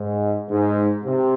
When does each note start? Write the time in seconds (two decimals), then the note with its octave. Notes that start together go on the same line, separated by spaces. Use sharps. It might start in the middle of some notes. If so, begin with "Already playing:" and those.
Already playing: G#2
0.49 G#2
1.04 C3